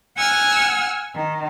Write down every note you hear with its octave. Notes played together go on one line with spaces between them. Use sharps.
F#5 G#5 E6 F6
D#3